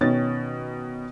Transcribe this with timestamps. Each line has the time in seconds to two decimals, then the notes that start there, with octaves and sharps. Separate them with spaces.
0.01 B2 D#3 C#4 A6